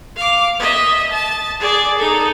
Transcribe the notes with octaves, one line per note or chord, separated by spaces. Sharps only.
F5 D6
D#5 E5
A5
G#4 D5
D#4 A4